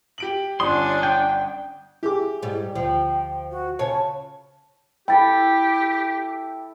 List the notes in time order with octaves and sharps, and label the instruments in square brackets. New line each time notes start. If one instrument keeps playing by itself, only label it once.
[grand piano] G4 D7 F#7
[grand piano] G1 D#6 [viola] C#4 D4 [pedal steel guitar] C6
[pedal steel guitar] G5
[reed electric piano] E4 G#4 [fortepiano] G4 D6
[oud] G#2 G3
[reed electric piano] D2 [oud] F3 [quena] G5
[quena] F#4
[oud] C#3 C#5 [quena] A5
[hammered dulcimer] E4 A4 [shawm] G4 [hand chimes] G5 A6